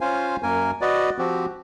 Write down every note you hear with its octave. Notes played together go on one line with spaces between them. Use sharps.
C#4 F4 C5 F5 G#5
F#2 A#3 A#4 G#5
F#4 B4 D5 D#5
F3 C4 F#4 G4